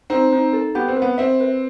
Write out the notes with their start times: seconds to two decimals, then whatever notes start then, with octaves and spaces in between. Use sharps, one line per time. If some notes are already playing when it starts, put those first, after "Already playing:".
0.10 C4 D#4
0.32 D#4
0.53 A4
0.75 B3 G4
0.88 C4
0.96 B4
1.02 B3
1.18 C4 E5
1.40 B4